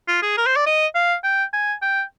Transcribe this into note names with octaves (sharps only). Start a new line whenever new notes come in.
F4
G#4
A#4
C5
D5
D#5
F5
G5
G#5
G5